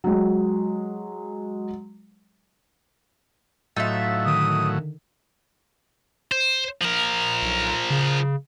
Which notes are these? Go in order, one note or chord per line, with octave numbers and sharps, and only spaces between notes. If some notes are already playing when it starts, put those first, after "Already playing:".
F#3 G#3
A2 F#3 D#4 F4 E5 E6 A6
D3 D#3 D#6
C5
F3 A#4
B1
C#3